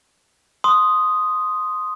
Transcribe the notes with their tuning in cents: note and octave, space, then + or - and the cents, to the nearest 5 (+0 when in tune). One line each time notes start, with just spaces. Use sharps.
C6 +0 D#6 +0